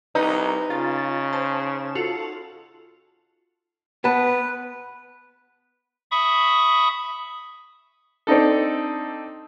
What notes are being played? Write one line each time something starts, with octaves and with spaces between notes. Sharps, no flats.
C2 D#4 B4
C#3 F4 A6
C5 A5
F4 F#4 A4
B3 B4 A5
E5 B5 C#6 D#6
C4 D4 D#4 A4